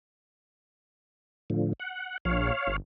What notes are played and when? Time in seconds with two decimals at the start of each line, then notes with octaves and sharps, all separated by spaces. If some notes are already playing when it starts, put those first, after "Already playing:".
1.50 A2 D3 F3
1.80 F#5
2.25 A#1 C#5 F5
2.67 G1